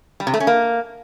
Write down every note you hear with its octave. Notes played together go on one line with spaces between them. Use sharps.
G3
C3
A3
C#4
A#3